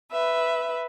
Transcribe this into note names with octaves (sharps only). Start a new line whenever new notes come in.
B4 E5